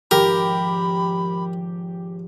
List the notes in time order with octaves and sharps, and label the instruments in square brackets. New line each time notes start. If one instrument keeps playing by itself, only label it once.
[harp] G#1 F3 [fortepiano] G4 [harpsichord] A#4 [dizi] B5